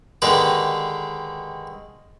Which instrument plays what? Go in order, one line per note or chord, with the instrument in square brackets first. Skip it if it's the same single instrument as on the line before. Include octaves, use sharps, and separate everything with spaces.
[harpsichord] D3 D#3 G#3 G4 G#4 B4